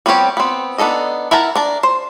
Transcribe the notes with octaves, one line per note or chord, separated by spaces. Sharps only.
G3 B3 C4 G4 C#5
B3 C4
B3 D4 D#4 A4 D#5
E4 A#4 F#5 A5 A#5
D4 A#4 A5
C5